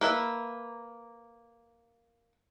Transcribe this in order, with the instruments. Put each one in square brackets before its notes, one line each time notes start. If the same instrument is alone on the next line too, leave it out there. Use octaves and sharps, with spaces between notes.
[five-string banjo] A#3 B4 E5